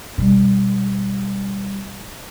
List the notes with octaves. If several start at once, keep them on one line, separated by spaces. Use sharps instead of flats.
B2 G3